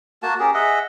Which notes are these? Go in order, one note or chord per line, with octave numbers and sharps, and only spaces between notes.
A#3 F#4 A5
C#4 G4 G#4 A#4
G#4 D#5 E5 F#5